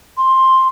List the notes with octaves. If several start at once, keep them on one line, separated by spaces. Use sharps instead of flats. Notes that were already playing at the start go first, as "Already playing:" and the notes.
C6